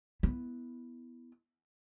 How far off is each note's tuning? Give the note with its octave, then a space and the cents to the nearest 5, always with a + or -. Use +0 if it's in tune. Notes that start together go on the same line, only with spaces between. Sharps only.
B3 +0 E4 +0